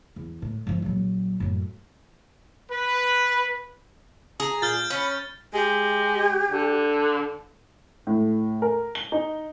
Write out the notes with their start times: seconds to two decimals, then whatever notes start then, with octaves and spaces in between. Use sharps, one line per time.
0.16 E2
0.42 A2
0.67 G2 F3
0.82 A#1 F#3
1.40 F#2 A2
2.70 B4
4.40 G#4 A#5
4.62 A#2 F6 G6 A6
4.90 C#4 B5
5.54 G#3 G4
6.51 D3
8.07 A2
8.62 A#4
8.95 G7
9.12 D#4